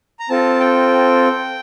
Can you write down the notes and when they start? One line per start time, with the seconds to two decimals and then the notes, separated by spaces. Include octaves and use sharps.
0.19 A#5
0.29 C4 F4 A4 A5
0.60 G5